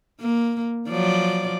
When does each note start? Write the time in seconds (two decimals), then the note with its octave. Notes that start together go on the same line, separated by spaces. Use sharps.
0.20 A#3
0.89 F3 F#3 D5